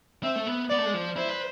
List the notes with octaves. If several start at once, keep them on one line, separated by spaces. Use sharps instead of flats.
C4 E5
A3
B3
B3 D5
A3
G#3
F3
E4 C5
B4